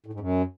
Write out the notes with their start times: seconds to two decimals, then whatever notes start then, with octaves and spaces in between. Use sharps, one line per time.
0.06 A2
0.13 G#2
0.20 F#2